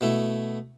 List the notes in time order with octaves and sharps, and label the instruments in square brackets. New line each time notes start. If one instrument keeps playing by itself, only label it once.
[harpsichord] B2 A3 E4